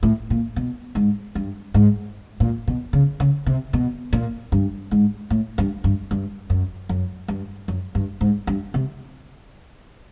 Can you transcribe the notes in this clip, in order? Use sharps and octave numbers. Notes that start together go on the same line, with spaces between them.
A2
A#2
B2
G#2
G2
G#2
A#2
B2
C#3
C#3
C3
B2
A#2
G2
G#2
A2
G2
G2
G2
F#2
F#2
G2
F#2
G2
G#2
G2
C3